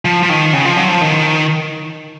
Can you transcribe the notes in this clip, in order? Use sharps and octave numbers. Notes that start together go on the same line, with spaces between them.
F3
F3
D#3
C#3
F3
F#3
F3
D#3